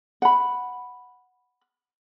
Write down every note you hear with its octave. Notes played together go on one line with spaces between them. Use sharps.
F#5 B5